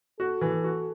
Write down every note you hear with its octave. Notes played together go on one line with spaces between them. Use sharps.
F#4 A4
E3
F#4